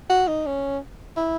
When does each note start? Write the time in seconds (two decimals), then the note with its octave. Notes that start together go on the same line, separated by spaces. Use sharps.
0.10 F#4
0.28 D#4
0.46 C#4
1.17 E4